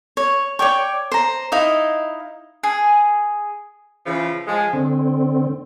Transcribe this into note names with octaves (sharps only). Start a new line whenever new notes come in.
C#5
C#5 D5 G5 C#6
C5 A#5
D#4 E4 D#5 F5
G#4
C#3 E3 F3
F3 G#3 G#5
D3 C4